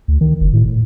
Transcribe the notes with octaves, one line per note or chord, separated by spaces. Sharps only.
D2
D#3
F#1
A2
A2